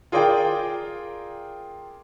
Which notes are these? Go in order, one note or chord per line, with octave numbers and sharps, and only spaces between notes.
F4 G#4 A#4 D5 G5